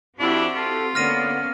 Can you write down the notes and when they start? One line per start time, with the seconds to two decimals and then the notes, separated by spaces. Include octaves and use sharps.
0.19 F2 C4 D4 E4 F#4 G4
0.56 F4 A4
0.95 D3 A#3 B3 C#4 F6 A#6 D#7